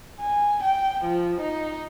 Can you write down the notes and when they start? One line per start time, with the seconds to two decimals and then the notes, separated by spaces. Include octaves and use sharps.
0.20 G#5
0.63 G5
1.04 F3
1.41 D#4